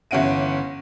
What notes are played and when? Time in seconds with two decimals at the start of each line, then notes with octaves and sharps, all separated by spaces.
0.11 G1 E3 C#4 F#5 D7 D#7